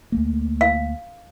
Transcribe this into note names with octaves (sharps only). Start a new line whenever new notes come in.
D2 A3 A#3
F5